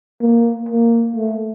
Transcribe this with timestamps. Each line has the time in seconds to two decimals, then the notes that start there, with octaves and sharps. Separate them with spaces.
0.22 A#3
0.69 A#3
1.16 A3